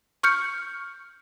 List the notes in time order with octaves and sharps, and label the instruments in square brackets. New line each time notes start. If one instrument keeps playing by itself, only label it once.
[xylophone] C#6 F6 G6 C#7